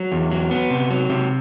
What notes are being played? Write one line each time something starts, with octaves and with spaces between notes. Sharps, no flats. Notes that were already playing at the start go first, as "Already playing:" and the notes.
Already playing: F#3
E2
F#3
B3
C3
F#3
C3